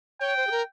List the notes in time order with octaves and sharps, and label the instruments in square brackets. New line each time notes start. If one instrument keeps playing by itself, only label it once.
[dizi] C#5 [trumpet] G5
[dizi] C5
G#4
A#4